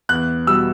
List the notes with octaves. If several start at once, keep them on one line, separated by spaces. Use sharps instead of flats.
E2 F#6
B2 G3 E6